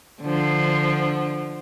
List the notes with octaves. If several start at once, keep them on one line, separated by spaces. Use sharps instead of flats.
D3 F3